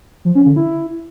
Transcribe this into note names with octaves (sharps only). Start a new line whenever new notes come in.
F3
C#4
D3
E4